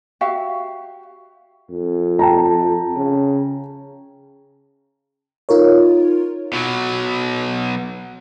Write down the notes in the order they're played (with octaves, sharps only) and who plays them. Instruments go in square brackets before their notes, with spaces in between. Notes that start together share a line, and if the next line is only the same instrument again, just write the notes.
[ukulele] F#4 G4 E5 F5
[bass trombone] F2
[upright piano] G5 A5 A#5
[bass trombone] C#3
[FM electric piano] D#4 F4 A#4 C#5
[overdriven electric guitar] B2 F#3